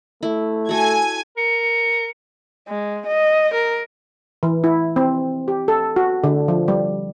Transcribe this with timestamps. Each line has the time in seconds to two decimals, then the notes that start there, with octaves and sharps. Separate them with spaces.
0.23 A3 E4
0.69 F#4 A4 G#5 G#6
1.37 A#4 C#7
2.69 G#3
3.07 D#5
3.54 A#4
4.43 E3
4.64 E4
4.96 C4
5.48 G4
5.68 A4
5.96 F#4
6.24 D3
6.48 F3
6.68 G3